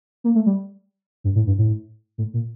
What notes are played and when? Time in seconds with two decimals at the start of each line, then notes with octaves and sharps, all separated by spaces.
0.24 A#3
0.35 A3
0.46 G3
1.24 G2
1.35 A2
1.47 G2
1.58 A2
2.18 A2
2.34 A#2